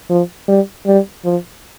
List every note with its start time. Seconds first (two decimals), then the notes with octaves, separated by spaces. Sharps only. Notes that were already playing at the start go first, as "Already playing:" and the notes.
0.10 F3
0.48 G3
0.87 G3
1.25 F3